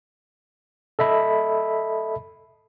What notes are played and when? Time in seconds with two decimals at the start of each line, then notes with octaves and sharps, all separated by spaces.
0.99 A4 D#5 E5 B5